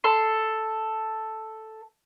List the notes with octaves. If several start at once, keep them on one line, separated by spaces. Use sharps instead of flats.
A4 C6